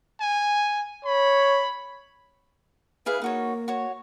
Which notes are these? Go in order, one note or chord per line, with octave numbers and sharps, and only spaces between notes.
G#5
C#5 B5
E4 G#4 B4 F5
A#3 D#4 F#4 C#5
F#4 C#5